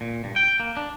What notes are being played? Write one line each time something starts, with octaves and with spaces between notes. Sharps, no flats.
A#2
G2
G5
A#3
D4